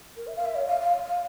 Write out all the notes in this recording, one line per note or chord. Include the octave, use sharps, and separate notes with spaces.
A#4
E5
F5
E5
C#5
F5
F5
F5